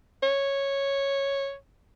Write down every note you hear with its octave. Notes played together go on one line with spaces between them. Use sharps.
C#5